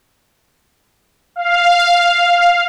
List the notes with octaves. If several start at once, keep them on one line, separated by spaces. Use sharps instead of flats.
F5